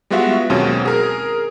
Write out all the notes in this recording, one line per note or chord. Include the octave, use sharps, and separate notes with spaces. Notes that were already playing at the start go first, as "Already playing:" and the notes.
G3 G#3 B3 F4 F#4 E5
D#2 B2 F#3 G#3 C4 C#4
G#4 A#4